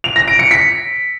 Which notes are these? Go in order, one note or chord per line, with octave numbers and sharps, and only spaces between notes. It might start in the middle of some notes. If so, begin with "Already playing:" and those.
F7
A#6
D7
C#7
B6